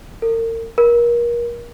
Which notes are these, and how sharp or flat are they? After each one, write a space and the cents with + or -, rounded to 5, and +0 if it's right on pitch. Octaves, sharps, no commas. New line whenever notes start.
A#4 -40
A#4 +30